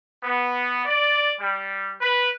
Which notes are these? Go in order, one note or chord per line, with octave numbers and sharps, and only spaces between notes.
B3
D5
G3
B4